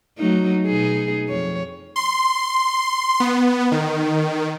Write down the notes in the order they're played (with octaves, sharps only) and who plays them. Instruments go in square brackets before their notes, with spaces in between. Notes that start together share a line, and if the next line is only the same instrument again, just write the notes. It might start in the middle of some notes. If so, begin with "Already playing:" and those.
[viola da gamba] F#3 A3 D#4
B2 D#4 G#4
F2 C#5
[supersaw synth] C6
B3
D#3